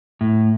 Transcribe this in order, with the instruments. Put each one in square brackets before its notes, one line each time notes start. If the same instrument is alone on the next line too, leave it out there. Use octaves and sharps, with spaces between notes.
[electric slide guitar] A2